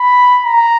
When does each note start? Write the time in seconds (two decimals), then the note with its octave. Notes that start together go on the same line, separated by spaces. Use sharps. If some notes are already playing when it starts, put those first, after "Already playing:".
Already playing: B5
0.45 A#5